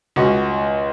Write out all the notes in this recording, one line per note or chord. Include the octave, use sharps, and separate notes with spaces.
C#2 F#4